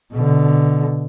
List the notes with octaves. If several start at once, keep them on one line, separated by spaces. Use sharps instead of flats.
B2 D3